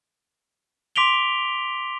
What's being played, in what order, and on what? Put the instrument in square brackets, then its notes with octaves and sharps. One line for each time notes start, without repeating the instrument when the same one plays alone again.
[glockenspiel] C6 D6 B6 D7 F7 G7